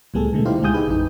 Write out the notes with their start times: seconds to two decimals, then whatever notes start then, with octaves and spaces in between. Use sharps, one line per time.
0.14 C#2 A2 G3 B3 G#4 A4
0.33 B2 D3 G#3 A3
0.45 D#4 E4 G4 C5 F5
0.62 C#2 G#3 G4 G#5 D#6 G6
0.74 D#4 G4 G#4 B4
0.86 A1 F2 D#4